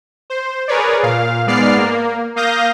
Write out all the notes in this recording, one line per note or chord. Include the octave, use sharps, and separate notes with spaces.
C5
G#4 A#4 B4 C#5 D5
A#2 F5
G#2 G#3 B3 D5 F6 C7
A#3
A#3 F5 D#6 G6 A#6